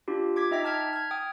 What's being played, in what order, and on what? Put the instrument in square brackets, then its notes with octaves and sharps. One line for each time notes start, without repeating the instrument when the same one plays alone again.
[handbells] D4 F4 G4
D6 G#6 B6
D#4 D#5 E5 G5 B6
A5 F6 G#6 B6
F6 G#6
G5 D#6